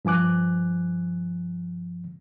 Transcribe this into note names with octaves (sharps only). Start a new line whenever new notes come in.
G2 F3 G#5 D6 F#6